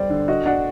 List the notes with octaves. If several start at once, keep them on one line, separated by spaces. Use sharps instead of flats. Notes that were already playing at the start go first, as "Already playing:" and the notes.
Already playing: G3 C5 D5
D3
F#4 D#5
D4 F#5